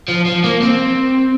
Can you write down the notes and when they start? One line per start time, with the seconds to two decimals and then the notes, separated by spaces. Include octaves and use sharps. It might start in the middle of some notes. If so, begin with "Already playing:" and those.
0.08 F3
0.26 F3
0.44 A#3
0.62 C4